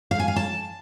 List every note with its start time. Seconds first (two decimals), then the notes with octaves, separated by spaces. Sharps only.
0.11 F5
0.19 G#5
0.28 F5
0.36 A5